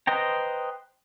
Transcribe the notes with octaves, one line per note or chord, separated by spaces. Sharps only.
B4 C5 D#5 G5 A#5